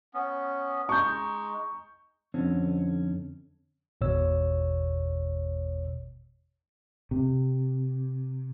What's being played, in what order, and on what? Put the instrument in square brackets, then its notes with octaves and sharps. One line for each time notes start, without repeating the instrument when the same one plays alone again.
[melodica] B3 C#4
[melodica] G#3 D#4 [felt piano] C#6 G6
[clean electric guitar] F2 D3 C4 C#4
[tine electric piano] G#1 E2 B2 C#5 E6
[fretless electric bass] C3